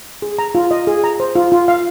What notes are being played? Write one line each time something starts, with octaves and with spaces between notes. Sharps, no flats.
G#4
A#5
F4
D#5
G#4
A#5
C5
F4
F4
F5